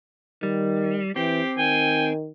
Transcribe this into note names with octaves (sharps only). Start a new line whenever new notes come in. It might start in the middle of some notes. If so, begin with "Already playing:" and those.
D#3 G3
E3 C4 G4
D#3 G5 G#5